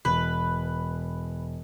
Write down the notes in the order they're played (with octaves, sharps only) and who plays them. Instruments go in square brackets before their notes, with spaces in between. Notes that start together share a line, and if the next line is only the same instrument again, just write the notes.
[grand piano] E1 [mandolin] B4